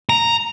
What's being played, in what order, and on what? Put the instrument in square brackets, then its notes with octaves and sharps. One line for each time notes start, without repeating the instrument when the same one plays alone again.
[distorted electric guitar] A#5